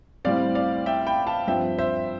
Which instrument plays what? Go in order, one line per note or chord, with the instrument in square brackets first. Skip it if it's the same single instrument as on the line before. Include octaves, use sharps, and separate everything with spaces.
[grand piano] A2 G3 C4 D5 F5
D5 F5
E5 G5
G5 B5
F5 A5
G2 F3 C4 E5 G5
C5 E5